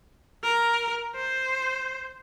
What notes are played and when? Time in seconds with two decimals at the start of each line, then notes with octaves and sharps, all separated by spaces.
0.43 A#4
1.16 C5